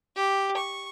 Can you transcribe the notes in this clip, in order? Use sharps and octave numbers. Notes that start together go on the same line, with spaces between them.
G4
C#6